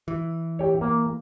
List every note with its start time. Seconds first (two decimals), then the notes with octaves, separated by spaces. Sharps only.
0.08 E3
0.59 G4 C#5
0.81 A#3